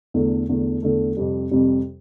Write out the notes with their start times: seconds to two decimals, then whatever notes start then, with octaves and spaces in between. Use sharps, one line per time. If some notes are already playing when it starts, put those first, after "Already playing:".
0.14 E2 D3 A3
0.49 E2 D3 A3
0.82 E2 D3 A3
1.17 F2 C3 G3
1.51 F2 C3 G3